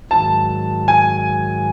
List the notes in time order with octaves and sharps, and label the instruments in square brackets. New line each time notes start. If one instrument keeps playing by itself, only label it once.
[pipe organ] G#2 D#3 F#3 [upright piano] A5
[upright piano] G#5